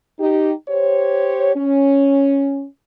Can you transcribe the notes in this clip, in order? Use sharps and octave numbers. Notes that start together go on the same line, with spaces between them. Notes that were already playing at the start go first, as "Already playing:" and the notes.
D#4 G4
G4 C5 C#5
C#4